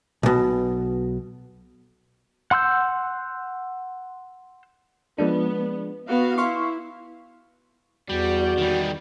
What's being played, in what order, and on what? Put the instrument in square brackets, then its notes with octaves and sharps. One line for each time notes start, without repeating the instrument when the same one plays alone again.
[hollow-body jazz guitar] B1 B2
[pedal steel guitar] F#5 C6 E6 G6
[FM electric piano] F3 G#3 D4 [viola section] B3
[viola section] B3 F#4 F5
[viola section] E4 [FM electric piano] F5 C6 C#6
[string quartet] E2 D5 G6 [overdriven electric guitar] G3 [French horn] F#4
[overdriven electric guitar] D#3 G3